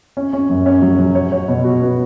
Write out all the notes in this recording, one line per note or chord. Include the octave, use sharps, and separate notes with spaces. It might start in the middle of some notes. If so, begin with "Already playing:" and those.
C#4
C#4
F#2
C#4
F#3
F#3
C#5
C#5
B2
F#4
B3